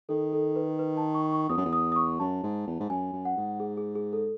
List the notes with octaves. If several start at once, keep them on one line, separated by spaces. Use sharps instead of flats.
D#3 A4
A4
B4
B4
A5
C#6
C#6
E2 D#6
F#2
E2
D#6
D#6
C#6
F#2 A5
G#2
E2
G#2
F#2 G#5
F#2
F#5
G#2
G#4
G#4
G#4
A4